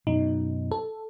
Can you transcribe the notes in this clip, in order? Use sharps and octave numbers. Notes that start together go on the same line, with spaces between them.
F#2 B2 D#4
A4